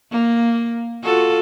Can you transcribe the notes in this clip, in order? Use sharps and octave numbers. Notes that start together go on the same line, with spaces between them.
A#3
F4 F#4 A4